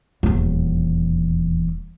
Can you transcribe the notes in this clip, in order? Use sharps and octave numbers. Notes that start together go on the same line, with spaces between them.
D#1 E2